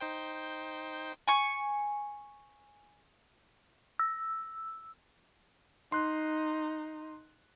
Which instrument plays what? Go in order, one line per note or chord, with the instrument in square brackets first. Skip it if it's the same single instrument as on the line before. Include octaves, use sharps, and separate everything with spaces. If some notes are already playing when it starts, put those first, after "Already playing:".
[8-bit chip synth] D#4 C5 G5
[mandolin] G#5 C#6
[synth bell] E6
[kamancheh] D#4 [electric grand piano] C6 F#6